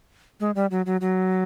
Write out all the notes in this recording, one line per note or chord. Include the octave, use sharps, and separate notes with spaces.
G#3
G3
F#3
F#3
F#3